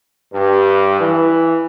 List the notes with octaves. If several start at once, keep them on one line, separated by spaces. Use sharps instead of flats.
G2
E3